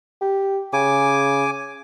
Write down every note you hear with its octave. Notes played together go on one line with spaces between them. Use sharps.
G4
C#3 G#5 D6